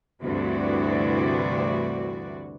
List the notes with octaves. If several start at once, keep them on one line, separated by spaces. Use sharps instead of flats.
D2 G2 C3 E3 F#4 D5